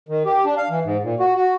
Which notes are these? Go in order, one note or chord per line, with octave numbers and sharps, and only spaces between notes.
D#3
G4
D4
F5
E3
G#2
A#2
F#4
F#4